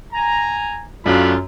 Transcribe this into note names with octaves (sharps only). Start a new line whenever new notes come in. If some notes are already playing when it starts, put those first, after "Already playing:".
G#5 A#5
F#2 F#3 A3 D4 F4 F5 B5